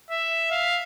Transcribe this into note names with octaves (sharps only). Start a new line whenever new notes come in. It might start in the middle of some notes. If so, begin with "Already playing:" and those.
E5
F5